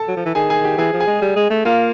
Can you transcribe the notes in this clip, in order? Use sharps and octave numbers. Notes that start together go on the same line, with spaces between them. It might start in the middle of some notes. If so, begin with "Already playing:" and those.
Already playing: A4 A5
F#3
F3
E3
D#3 G#4 G#5
G#4 G#5
G4 G5
E3 G#4 G#5
F3
G#4 G#5
G#3
G3
G#3
A3
A#3 F4 F5